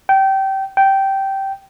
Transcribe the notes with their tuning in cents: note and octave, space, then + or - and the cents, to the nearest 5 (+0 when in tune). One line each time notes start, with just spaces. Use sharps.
G5 -25
G5 -15